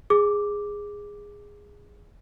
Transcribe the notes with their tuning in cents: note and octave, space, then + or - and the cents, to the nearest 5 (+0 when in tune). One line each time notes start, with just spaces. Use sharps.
G#4 -10 D6 +0